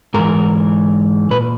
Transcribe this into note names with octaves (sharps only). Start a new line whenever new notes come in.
G#2 E3 A#4
A#2 B4